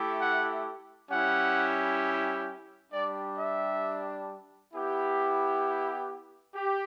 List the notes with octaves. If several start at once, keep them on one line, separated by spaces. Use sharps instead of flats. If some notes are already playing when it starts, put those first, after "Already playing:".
Already playing: A3 E4 G4
F#5
G3 C#4 E4 G4 F#5
G3 D4 G4 D5
E5
B3 E4 G4
G4